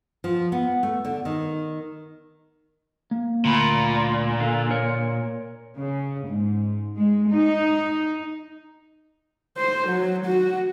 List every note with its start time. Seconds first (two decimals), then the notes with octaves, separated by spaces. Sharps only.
0.24 F3
0.52 B3
0.83 A3
1.05 D3
1.25 D#3
3.11 A#3
3.45 D2 A#2 B5
4.40 D3 F5
4.71 A#4 C#5
5.77 C#3
6.28 G#2
6.97 G#3
7.31 D#4
9.57 C5
9.88 F#3
10.26 F#4